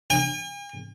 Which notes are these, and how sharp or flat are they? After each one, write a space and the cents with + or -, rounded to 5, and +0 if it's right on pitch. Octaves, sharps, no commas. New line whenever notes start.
G#5 -45